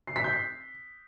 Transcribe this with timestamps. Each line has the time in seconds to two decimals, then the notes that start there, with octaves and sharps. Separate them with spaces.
0.07 C7
0.16 B6
0.24 G6
0.33 C7